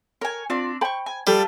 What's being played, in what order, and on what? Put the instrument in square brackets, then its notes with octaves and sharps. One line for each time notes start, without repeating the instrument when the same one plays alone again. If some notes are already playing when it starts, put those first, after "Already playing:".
[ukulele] A#4 [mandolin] C#5 G#5
[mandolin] C4 D4 D5 [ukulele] F4
[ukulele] C5 G5 B5 [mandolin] A5 C#6
[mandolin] G#5
[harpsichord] G3 [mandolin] A3 F4 A5 [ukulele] G4 A4